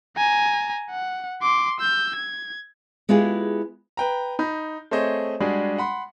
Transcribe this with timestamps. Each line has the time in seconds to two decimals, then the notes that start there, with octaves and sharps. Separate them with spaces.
0.17 G#5 A#5
0.91 F#5
1.42 C6 D6
1.80 E6 G6
2.16 G#6
3.09 G#3 B3 E4 F4 G4 G#4
3.97 B4 G5 A#5
4.39 D#4 B5 G6
4.91 A3 C4 G#4 C5 C#5 D#5
5.40 G3 G#3 D4 F#4 G#4
5.78 F#5 B5 C6